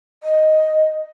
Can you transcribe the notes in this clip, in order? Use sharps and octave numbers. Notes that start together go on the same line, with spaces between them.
D#5